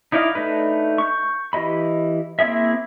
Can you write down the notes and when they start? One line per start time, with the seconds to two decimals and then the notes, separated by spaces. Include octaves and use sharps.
0.12 D#4 E4 D5 D#5 F5
0.35 A3 D4 D#4 B4
0.98 C#6 G6
1.53 E3 G4 D#5 B5
2.39 A#3 C4 E4 G#4 E5